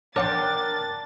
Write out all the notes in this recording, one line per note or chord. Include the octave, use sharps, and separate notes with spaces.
D4 A#4 C#5 F#5 G5 C6 A6